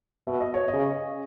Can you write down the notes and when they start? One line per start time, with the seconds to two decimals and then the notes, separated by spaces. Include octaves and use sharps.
0.27 B2 E5
0.40 D#5
0.54 C#5
0.68 D#5
0.73 C#3